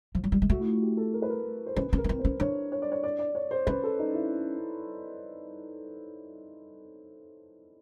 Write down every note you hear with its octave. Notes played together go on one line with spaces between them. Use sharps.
F3
F#3
G3
G#3
A3 F#4
E4
F4
F#4
G4
A4
A#4
B4
A#4
C5
C#4 B4
C#4
A#4
C#4
C4
C5
C#4
D4 C#5
C#5
D5
C#5
D5
D5
C#5
C5
C#4 B4
A4
D#4
E4